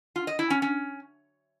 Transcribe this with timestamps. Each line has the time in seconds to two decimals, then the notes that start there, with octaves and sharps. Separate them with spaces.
0.16 F4
0.27 D#5
0.39 E4
0.50 C#4
0.62 C#4